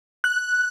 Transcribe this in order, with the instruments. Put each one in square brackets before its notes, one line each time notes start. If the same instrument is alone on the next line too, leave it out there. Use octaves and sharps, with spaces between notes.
[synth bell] F#6